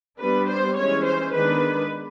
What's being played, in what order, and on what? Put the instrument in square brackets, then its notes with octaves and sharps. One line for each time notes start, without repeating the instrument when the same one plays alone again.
[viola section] G3 B3 D4 B4
C5
E3 G#3 C#4 C#5
C5
D#3 G#3 B3 D4 B4